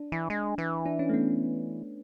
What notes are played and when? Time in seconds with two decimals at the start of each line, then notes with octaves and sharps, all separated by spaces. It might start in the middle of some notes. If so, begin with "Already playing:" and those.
Already playing: D4
0.12 E3
0.30 G#3
0.58 E3
0.86 D4
0.99 C#4
1.09 A3
1.14 B3